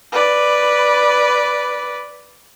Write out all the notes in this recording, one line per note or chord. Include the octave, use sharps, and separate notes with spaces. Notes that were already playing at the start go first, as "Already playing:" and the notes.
B4 D5